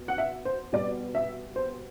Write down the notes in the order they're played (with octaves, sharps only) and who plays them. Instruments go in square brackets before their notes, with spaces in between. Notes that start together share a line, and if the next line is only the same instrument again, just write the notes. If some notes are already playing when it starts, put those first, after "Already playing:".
Already playing: [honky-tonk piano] B2
F#5
E5
C5
B2 G3 B3 D5
E5
C5